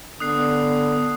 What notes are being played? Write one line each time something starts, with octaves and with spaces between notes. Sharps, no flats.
D3 B3 D#6 F#6 C7